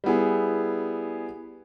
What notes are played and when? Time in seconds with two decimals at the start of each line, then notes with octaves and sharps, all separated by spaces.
0.04 G3 B3 E4 G#4